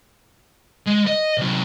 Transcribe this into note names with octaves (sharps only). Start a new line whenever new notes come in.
G#3
D#5
C3 F#3